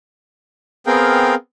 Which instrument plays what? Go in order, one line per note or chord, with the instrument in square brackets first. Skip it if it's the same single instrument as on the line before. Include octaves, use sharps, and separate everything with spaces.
[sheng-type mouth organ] B3 C4 G#4 A#4 F5 G5